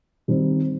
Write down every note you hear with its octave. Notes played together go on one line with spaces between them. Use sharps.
D#3 G3 C4 D#4